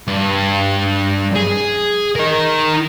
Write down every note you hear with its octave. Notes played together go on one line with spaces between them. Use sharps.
G2
G#4
D#4 A#4